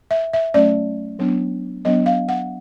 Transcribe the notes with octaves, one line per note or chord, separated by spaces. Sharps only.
E5
E5
F#3 A3 C#4 D5
F#3 B3 D4
F#3 B3 D4 D#5
F5
F#5